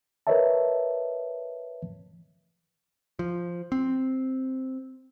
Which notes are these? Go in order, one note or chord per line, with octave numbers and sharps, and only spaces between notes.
A#4 B4 C#5 D#5 E5 A5
F3
C4